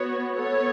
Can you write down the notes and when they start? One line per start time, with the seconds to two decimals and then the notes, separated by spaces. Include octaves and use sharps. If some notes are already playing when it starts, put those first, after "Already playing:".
Already playing: B3 F#4 C#5
0.34 B3 A4 C#5